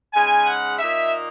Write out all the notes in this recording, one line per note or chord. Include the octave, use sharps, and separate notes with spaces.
C#3 G#3 D#4 G#5
F#5
A#2 A#3 D#4 E5